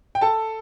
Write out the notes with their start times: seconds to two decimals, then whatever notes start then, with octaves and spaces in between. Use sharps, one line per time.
0.15 G5
0.21 A4 A5